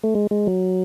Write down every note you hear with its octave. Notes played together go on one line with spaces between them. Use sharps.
A3
G#3
G#3
F#3